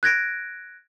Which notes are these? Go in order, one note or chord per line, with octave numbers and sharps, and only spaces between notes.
F#6 G#6 A#6 D7